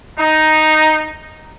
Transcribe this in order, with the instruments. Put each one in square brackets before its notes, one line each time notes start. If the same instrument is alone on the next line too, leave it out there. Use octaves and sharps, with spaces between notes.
[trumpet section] D#4